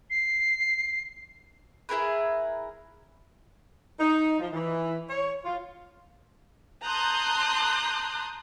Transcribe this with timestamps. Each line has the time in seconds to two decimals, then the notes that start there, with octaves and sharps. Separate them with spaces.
0.10 C7
1.89 E4 G#4 A#4 B4
4.00 D#4
4.40 F3
4.53 E3
5.10 C#5
5.45 F4
6.86 A5 A#5 C6 D#6 F#6 G6